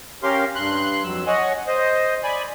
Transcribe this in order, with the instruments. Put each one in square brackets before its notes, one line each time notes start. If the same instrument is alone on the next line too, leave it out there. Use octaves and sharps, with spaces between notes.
[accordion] C#4 G4 A#4 F5 C6
G2 C6 F#6
F2 F#3 E6
C#5 D#5 F#5 G#5
C5 D#5
D5 G#5 B5